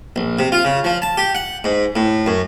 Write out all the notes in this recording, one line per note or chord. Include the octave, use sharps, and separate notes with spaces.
A#1
C3
F4
C#3
F3
A5
G4
F#5
G#2
A2
F#2